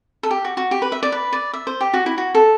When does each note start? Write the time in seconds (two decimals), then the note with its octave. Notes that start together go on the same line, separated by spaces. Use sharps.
0.23 A4
0.31 G4
0.45 F#4
0.57 F#4
0.71 G4
0.82 B4
0.92 E5
1.03 D5
1.12 B4
1.33 D5
1.53 E5
1.67 C5
1.81 G4
1.94 F#4
2.06 E4
2.18 F#4
2.35 A4